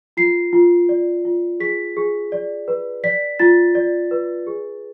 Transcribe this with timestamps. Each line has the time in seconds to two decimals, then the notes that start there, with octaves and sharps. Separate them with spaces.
0.17 F4 C7
0.53 F4
0.89 D5
1.25 F4
1.60 G#4 B6
1.97 G#4
2.32 D5
2.68 B4
3.04 D5 B6
3.39 F4 A6
3.75 D5
4.11 B4
4.47 G#4